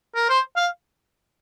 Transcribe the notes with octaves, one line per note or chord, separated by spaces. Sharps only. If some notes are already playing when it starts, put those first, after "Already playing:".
A#4
C5
F5